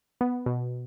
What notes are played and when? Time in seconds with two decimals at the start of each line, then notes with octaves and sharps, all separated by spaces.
0.21 B3
0.46 B2